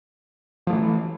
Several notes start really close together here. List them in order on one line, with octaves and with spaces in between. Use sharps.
F3 A3 E3